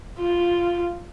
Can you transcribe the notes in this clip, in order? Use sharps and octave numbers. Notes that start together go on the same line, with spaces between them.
F4